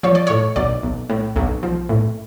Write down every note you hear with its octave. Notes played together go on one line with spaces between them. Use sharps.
F3 C#5
D5
A2 C#5
B1 D5
B1
A2
B1
F3
A2